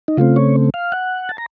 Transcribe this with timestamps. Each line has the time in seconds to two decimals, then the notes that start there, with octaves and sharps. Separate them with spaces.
0.08 D#4
0.17 C#3 A3 C4 F4
0.36 C#5
0.74 F5
0.92 F#5
1.29 A5
1.38 A#5